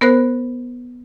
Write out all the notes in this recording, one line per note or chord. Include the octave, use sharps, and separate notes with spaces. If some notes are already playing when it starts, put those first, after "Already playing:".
B3 A#4 C5 F#6